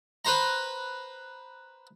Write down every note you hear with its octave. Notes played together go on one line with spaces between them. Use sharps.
B4 C5 A#5